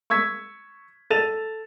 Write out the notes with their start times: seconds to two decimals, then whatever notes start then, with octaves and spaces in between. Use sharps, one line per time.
0.10 C#6 E6 G#6 B6
1.10 A4 A6 E7 F7